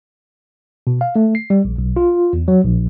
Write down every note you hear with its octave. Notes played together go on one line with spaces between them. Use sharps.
B2
F5
A3
C7
G3
A#1
B1
F4
E2
F#3
A#1